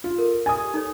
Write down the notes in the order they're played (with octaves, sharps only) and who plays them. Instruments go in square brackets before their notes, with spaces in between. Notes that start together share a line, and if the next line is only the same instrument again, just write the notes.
[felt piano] F4
[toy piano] A4 A#4
[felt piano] G#5 D#6
[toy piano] G4
D#4 A4 C#5